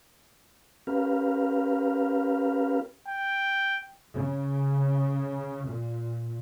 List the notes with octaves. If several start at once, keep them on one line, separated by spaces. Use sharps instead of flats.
C#4 G4 A#4 B4 F5
G5
C#3
A#2